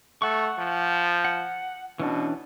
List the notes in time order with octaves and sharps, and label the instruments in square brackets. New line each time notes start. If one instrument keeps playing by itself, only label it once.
[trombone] A3 [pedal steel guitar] F#5 C#6
[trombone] F3
[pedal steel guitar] F#5
[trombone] B2 [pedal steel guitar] E3 C#4 D4